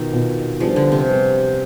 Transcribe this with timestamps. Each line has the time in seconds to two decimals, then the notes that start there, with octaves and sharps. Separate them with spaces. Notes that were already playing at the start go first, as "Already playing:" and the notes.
Already playing: B2 D#3 B3 F4
0.13 B2 B3 F4
0.60 F3 G3 B3 D4 G#4
0.76 D3
0.92 C3
1.08 G3 B3 D4 G#4